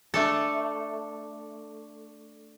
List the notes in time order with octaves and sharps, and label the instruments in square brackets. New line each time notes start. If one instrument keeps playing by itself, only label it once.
[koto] A3 D4 A4